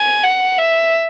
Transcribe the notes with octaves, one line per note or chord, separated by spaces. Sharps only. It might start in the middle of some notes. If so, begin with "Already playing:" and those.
Already playing: G#5
F#5
E5